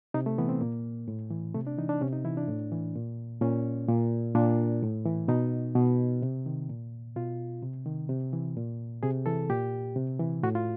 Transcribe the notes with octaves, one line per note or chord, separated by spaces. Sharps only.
C3 D#4
A3
E3 B3
C4
A#2 A#3
A2
E3
C3 A3
D4
E3 D#4
D4
C3 C#4
D#4
E3 E4
D4
A2
E3
A#2
A#2 C#4
A#2
A#2 D4
A2
E3
B2 D#4
B2
C3
D#3
A#2
B2 F4
C3
D#3
C3
E3
A#2
C3 G#4
E3 A4
A#2 G4
C3
E3
A2 F#4
F4